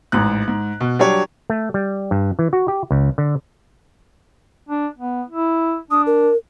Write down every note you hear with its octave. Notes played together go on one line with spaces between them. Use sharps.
A1 G#2 F#6
G#2
B2
F#3 G3 D4 G4 C#5
A3
G3
G2
E3
F#4
G4
C#2
D3
D4
B3
E4
D4 D#6
A#4